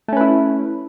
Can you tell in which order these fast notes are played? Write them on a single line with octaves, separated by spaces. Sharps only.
A3 C#4 B4 E4